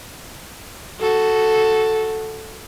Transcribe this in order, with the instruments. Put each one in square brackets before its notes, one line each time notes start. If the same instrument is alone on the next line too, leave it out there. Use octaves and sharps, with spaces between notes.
[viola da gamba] F#4 A4